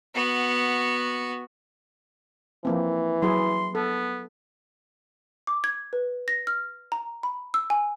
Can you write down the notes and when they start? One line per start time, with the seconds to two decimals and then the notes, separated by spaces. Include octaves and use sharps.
0.15 B3 F#4
2.65 E3 F3 A#3 C4
3.22 F#3 E4 G#4 C6
3.75 B3 A4
5.47 D6
5.64 G#6
5.93 B4
6.28 A#6
6.47 F6
6.92 A#5
7.23 B5
7.54 E6
7.70 G#5